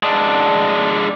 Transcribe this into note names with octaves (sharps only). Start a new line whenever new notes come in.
G#3 D4